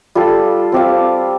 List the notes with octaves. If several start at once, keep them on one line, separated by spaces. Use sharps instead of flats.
G3 F4 A4
C4 G4 F5